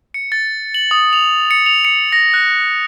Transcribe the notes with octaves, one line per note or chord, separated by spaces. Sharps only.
C#7
A6
F#7
D#6
F7
C#7
F7
C#7
A#6
F#6